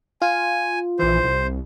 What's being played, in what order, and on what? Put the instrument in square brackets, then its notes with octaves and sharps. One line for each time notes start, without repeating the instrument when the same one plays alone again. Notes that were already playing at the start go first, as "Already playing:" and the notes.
[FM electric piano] F4 [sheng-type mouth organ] G#5
[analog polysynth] A#1 E3 [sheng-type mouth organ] C5
[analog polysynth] C2